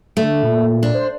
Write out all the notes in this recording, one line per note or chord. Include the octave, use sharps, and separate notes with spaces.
D3 A3
A#2
D4
C5